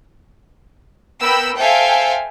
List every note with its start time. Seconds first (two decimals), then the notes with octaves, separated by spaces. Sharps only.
1.21 B3 A#4 G5 B5 E6
1.57 A4 C5 E5 F5 G5 G#5